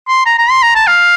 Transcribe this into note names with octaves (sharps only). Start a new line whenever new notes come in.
C6
A#5
A#5
C6
A#5
A5
F5